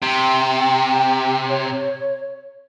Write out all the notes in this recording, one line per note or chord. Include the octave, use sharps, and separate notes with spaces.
C3 G5
C#5